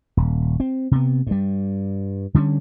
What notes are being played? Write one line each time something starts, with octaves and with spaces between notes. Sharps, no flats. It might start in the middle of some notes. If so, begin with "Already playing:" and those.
D#1
C4
C3 B3
G2 G3
D3 G3 A#3 C#4